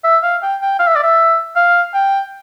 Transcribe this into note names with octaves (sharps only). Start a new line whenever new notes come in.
E5
F5
G5
G5
F5
E5
D5
E5
F5
G5